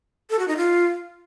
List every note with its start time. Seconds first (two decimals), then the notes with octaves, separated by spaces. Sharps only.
0.30 A4
0.39 F#4
0.48 D#4
0.57 F4